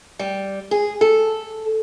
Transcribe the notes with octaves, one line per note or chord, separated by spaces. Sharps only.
G3
G#4
A4